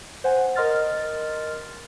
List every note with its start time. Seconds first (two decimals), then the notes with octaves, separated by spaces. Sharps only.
0.24 C5 F#5 G#5
0.56 A#4 D#5 C6 F6 A6